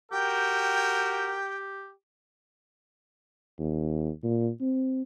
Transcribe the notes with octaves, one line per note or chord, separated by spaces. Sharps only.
F#4 G4 A#4 G5
D#2
A#2
C4